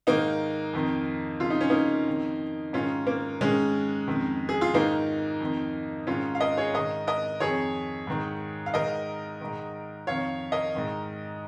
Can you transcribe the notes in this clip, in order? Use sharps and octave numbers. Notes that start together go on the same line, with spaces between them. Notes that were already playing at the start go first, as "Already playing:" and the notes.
G#2 D#3 A#3 D#4
F2 D#3
F2 C#3 F4
D#4
C#4
A#3 D#4
F2 D#3
G#2 D#3 C#4 F4
A#3
G#2 D#3 G#3 C#4
F2 D#3
G#4
F4
G#2 D#3 A#3 D#4
F2 D#3
G#2 D#3 C#4 F4
F5
A#4 D#5
G#4 C#5
G#2 D#3 A#4 D#5
A#4 D#5
F2 D#3 G#4 C#5
G#2 D#3
F5
G#2 D#3 A#4 D#5
G#2 D#3
F2 D#3 C#5 F5
A#4 D#5
G#2 D#3